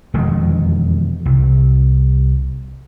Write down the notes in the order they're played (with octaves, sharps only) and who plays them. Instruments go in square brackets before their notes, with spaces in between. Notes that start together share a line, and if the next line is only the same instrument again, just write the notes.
[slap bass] E1 F2 D#3 G#3
C2